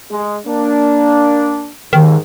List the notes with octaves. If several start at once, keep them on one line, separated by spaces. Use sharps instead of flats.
G#3
A#3 D4
D#2 G#2 D#3